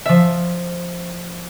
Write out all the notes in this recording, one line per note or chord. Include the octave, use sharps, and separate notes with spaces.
F3 E5